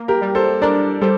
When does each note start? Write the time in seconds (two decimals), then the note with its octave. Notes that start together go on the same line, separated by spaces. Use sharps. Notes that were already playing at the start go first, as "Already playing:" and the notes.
Already playing: A#3
0.08 G4 A#4
0.21 G3
0.35 A4 C5
0.62 D4 A#4 D5
1.02 G3 A4 C5